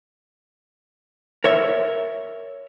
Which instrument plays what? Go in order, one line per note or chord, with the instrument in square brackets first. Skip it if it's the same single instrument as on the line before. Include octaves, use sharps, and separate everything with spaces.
[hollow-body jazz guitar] A#4 C#5 E5